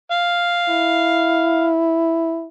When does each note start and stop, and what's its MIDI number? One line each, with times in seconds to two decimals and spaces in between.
0.12 1.68 77
0.69 2.48 64